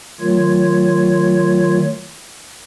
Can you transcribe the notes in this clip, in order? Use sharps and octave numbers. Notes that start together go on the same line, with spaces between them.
D#3 F#3 A3 F4 C#5